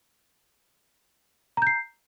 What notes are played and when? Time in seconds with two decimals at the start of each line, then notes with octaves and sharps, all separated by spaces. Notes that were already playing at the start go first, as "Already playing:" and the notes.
1.57 A#5
1.62 G6
1.67 C7